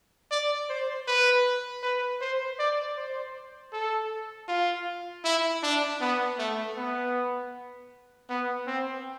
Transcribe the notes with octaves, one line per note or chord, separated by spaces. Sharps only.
D5
C5
B4
B4
C5
D5
C5
A4
F4
E4
D4
B3
A3
B3
B3
C4